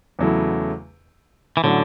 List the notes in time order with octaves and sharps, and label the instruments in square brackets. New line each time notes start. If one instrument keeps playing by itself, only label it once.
[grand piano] E2 C#3 F#3 A3 E4
[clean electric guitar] E3
[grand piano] A2 F#3 C#4 F#4 [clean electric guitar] D3